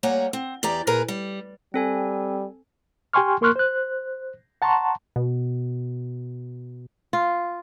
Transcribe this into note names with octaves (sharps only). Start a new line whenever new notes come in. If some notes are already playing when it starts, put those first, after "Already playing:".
G3 A#3 C#5 F#5 G#5 A#5
C4
E2 G4 D5 A#5
A#2 G#4 A#4 B4 A#5
G3
G3 C4 A4 G#5
G4 G5 G#5 C6 C#6 F6
A#3 A#4 C6 C#6 F6 F#6
C5 F#6
F#5 A5 A#5 C6 C#6
B2
F4